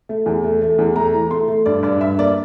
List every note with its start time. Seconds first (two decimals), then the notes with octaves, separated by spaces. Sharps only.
0.09 A3
0.26 E2
0.44 A3
0.62 A3
0.78 E2
0.95 A3 A#5
1.14 E3
1.31 A3 C6
1.48 A3
1.66 G2 D5
1.83 G2 D5
2.01 G2 E5
2.18 A#3 D5